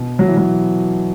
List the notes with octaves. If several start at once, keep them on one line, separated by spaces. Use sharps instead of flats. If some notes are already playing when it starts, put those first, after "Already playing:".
Already playing: B2
F#3
E3
F#3